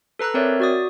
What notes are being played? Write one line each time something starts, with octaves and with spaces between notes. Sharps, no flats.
A4 B4 A#5 E6 F#6
C4 A#4 C#5 D5 E5
F#4 D5 D#6